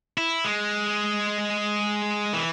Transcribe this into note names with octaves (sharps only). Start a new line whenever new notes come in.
E4
G#3
E3